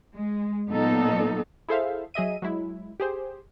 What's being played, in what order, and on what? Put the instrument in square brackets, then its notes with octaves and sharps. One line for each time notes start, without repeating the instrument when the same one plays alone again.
[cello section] G#3
A#2 F#3 B3 D#4 A4
[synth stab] E4 G#4 A4 C5 E5 F5
F#3 G#4 D#5 E5 D#7
F#3 G#3 E4
G4 G#4 C5